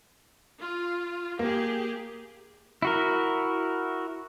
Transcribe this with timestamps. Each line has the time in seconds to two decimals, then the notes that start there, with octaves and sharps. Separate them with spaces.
0.59 F4
1.39 A#3 G4 G#4
2.82 E4 F#4 A#4